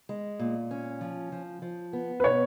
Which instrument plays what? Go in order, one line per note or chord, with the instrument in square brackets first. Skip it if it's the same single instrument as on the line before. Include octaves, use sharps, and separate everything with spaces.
[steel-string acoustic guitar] G#3
A#2
C#4
F3
F3
F3
B3
[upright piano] B4
[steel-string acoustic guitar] B2 [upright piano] C#5